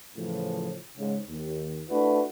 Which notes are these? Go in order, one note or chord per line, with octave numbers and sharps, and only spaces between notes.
A2 C#3 E3 F3
G#2 C#3
D#2
A3 D4 E4 F#4 B4